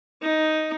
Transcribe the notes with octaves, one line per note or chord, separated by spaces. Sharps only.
D#4